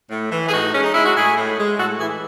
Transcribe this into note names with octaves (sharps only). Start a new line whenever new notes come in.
A2
E3
G#4
A2 D#4 F#4
G#3 C#4
D#4
G#3 E4
F#4
A2 E4 G#4
A2
G#3
A2 F#4 A4
E3 E4 G#4